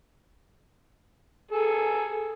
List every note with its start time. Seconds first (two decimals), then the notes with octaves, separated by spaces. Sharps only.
1.51 G#4 A4